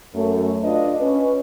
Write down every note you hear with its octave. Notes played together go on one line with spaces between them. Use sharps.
F#2 A3
D4 F4 B4 D#5
C#4 B4